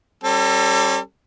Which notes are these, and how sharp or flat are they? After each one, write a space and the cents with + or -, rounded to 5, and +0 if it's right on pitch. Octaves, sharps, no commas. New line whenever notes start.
G3 -15 C#4 -40 A4 +30